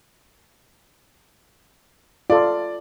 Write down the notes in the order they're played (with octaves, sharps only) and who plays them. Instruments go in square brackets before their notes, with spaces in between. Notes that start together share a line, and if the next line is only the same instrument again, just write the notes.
[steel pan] F4 A4 [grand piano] D5